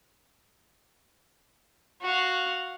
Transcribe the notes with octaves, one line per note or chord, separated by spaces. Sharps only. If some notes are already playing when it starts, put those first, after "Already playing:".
F#4 F5